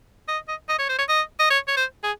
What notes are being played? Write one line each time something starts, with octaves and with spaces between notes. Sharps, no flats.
D#5
D#5
D#5
C#5
C5
C#5
D#5
D#5
C#5
C#5
C5
G#4